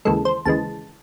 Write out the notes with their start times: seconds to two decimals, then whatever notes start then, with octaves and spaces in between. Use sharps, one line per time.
0.05 D#2 C#3 E3 G#3 A4
0.25 C5
0.45 D#2 C#3 E3 G#3 A5